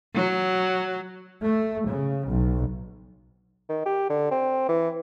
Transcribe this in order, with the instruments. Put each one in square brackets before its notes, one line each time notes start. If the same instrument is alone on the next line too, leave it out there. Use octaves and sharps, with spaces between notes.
[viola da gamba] F#3
[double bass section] A3
C#3
B1
[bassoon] D#3
G4
D3
C4
E3